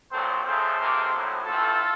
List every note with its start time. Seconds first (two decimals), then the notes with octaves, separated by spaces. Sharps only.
0.11 A#1 A#2 F#3 C4 A4 C5
0.45 F2 C#3 F3 A3 A4 C5
0.78 C#2 C3 D#3 A#3
1.12 A#1 A2 F#3
1.45 A1 A2 A3 C4 F4 A4